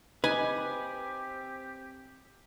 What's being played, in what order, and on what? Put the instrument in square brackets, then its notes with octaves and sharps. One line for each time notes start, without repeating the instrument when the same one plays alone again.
[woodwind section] C4 G4 [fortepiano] D#4 [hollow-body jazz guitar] B4 [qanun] G#5